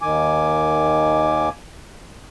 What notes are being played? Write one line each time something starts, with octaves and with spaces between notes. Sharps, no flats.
D#2 D#3 G#5 D6